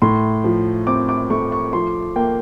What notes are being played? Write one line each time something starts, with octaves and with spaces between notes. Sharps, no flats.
A2 C6
F3
C4 D6
D6
A3 C#6
C#6
F3 C6
A#3 G5